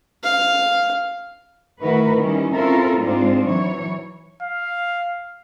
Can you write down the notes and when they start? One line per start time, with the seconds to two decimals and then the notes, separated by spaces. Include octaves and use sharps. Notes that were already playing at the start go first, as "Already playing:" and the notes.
0.24 F5
1.82 D#3 A3 E4 F#4 A#4 B4
2.18 D#3 G3 C#4 E4
2.54 C4 C#4 E4 F4 A4 A#4
3.01 G#2 G#3 C4 D4 D#4 F4
3.46 E3 F#3 C#5
4.42 F5